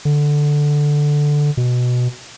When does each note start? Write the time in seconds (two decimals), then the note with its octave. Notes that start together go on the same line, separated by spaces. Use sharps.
0.05 D3
1.57 B2